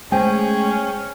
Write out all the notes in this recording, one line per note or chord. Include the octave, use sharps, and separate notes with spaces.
G#3 A3 C#4 G#4 C5 G5 G#5